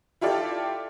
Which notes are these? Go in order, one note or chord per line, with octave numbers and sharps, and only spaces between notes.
E4 F4 G4 A4 D5